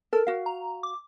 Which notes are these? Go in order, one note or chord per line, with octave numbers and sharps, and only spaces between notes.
A4 A#4
F#4 F5
A#5
D6